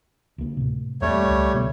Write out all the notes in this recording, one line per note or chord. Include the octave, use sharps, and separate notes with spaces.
D2 A#3
A2 C3
E2 G3 A3 A#3 C4 C#5
C#2
B2 D3 B3